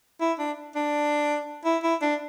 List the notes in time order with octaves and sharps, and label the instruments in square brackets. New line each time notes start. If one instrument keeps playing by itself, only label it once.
[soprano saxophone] E4
D4
D4
E4
E4
D4